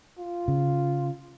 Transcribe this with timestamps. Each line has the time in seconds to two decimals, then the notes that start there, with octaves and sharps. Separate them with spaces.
0.19 F4
0.48 C#3